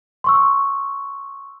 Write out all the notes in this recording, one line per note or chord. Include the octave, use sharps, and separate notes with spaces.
C6 C#6 E6